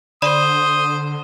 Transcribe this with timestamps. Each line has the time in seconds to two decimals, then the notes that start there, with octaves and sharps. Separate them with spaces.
0.22 D3 C5 D5 B5 D#6